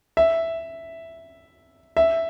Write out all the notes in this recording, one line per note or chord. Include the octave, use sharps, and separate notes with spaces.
E5
E5